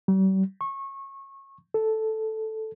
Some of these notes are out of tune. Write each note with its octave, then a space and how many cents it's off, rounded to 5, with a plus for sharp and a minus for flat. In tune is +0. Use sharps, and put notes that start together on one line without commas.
G3 -45
C#6 -25
A4 -5